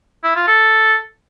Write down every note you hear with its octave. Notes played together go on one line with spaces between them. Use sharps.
E4
F4
A4